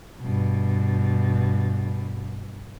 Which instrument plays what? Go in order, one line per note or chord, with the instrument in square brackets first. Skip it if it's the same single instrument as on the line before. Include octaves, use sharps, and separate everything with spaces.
[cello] G2 B2